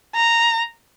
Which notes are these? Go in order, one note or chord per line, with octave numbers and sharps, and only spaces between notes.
A#5